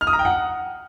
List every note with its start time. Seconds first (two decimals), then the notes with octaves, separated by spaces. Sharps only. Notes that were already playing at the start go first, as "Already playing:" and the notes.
0.01 F6
0.07 D#6
0.13 A#5
0.19 G5
0.25 F#5